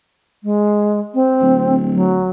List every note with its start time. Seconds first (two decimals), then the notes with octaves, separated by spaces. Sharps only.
0.44 G#3
1.14 C4
1.41 D1
1.93 F#3